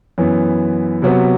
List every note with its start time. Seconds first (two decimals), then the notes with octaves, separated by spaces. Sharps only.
0.18 F#2 E3 B3
1.02 C3 F#3 B3 F#4 B4